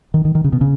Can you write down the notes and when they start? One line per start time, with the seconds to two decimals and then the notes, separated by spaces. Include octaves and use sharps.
0.14 D#3
0.25 D#3
0.35 D#3
0.44 C#3
0.53 B2
0.61 C#3